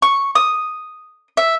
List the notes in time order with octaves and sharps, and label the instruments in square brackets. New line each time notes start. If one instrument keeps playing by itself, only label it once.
[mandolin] C#6
D#6
E5